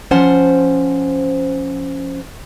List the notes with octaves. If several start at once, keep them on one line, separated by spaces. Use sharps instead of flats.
F3 C#4 C5 F#5 A5